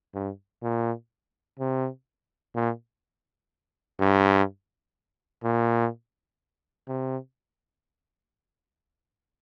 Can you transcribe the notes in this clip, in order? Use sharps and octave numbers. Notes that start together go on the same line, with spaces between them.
G2
A#2
C3
A#2
G2
A#2
C3